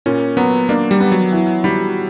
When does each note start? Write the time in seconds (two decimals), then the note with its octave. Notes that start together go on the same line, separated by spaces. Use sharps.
0.06 A#2 C#4
0.37 F#3 B3
0.69 A#3 D4
0.91 G3
1.00 B3
1.12 F#3
1.32 E3
1.64 G3